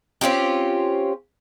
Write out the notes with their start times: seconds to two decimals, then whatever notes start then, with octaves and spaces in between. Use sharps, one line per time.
0.21 C4 C#4 F4 G4